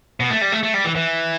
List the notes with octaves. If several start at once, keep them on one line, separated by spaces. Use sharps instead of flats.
B2
A3
G3
A3
A3
G3
E3
E3